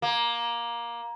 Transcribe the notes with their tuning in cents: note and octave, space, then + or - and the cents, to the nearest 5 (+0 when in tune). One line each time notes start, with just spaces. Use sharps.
A#3 +15